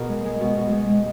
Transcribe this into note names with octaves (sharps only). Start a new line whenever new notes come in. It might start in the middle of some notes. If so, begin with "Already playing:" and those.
Already playing: B2 G#4 A#4
G#3
G#3
B2
B2
G#3
G#3